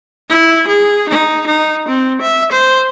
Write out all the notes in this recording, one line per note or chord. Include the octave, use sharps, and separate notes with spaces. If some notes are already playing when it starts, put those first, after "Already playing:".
E4
G#4
D#4
D#4
C4
E5
C5